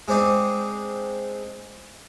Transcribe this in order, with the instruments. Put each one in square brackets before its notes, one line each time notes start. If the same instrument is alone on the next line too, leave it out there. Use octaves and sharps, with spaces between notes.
[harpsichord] G#3 C4 D4 D#4